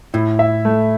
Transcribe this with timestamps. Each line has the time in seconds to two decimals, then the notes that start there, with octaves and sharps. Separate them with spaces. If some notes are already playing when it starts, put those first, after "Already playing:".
0.14 A2 E4
0.39 E5
0.65 A3